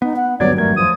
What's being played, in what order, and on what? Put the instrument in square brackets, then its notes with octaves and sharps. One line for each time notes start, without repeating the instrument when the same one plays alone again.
[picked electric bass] B3 [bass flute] D#4
[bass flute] F#5
[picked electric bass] G#1 G2 F#3 [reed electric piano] D2 B3 G#6 [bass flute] C#5 [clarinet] D5
[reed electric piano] E2 G#6 [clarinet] A3 [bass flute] A#4
[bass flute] F3 [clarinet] D#6